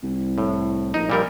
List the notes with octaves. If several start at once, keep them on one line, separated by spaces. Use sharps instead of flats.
C2
A2
A#1 D#4
A#2 G3 A#4